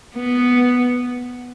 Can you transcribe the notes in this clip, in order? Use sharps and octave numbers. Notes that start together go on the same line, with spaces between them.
B3